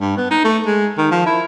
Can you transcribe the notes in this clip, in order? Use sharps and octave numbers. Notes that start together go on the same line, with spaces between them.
G2
B3
D#4
A3
G#3
D#3
F3
E4